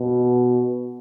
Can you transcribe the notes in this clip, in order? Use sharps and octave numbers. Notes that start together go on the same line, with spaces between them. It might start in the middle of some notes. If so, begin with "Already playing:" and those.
Already playing: B2